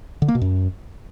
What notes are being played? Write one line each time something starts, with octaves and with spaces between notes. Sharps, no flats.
D3
A#3
B2
F#2